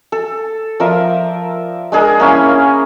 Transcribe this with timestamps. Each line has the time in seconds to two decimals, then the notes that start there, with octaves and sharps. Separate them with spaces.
0.12 A4
0.80 F3 A#4 D5 E5
1.92 G#3 D4 G#4 A#4
2.20 A#3 C#4 E4